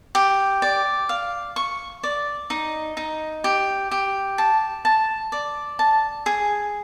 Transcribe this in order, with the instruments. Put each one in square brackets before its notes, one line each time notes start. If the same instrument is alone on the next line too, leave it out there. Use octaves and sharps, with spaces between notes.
[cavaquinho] G4
D5
F5
C#6
D5
D#4
D#4
G4
G4
A5
A5
D5
A5
G#4